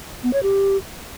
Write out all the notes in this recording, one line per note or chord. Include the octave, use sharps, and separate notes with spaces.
B3
C#5
G4